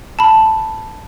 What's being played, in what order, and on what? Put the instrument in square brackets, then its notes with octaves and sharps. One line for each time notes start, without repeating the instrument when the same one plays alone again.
[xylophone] A5 B5